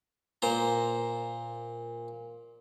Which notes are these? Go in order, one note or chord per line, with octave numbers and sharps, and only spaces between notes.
A#2 C5 A#5